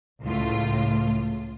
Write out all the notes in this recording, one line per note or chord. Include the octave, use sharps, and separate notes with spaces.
C#2 A2 F4